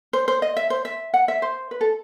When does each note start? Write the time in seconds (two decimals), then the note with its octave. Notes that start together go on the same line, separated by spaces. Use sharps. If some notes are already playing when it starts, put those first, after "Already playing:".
0.13 C5
0.28 C5
0.42 D#5
0.57 E5
0.70 C5
0.85 E5
1.14 F#5
1.28 E5
1.42 C5
1.71 B4
1.81 A4